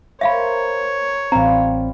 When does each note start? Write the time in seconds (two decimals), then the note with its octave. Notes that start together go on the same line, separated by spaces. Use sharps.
0.21 A#4 C5 C#5 E5 F5 B5
1.32 A1 G3 C4 F4 A#5